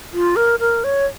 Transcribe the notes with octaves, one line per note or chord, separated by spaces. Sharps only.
F4
A#4
A#4
C#5